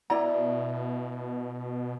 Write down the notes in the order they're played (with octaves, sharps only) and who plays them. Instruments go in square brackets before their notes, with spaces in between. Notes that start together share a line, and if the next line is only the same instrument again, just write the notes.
[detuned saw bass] B2 [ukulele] E4 D5 A#5